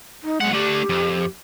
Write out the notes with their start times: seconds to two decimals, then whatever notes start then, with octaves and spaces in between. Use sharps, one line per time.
0.23 D#4
0.41 B1 G#3 F#5
0.53 A3 D4 G4
0.89 F2